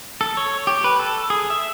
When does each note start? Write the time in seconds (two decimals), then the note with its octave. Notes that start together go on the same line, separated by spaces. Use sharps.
0.21 A4
0.37 C#5
0.67 G4
0.84 B4
0.99 A4
1.30 G#4
1.50 E5